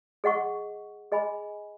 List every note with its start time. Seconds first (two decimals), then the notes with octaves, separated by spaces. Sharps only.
0.24 G#4 D#5 F#5 C#6
1.12 G#4 D#5 G#5 B5